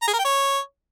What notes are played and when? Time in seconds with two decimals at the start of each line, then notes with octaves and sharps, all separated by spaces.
0.02 A#5
0.08 G#4
0.13 A#4
0.19 G5
0.25 C#5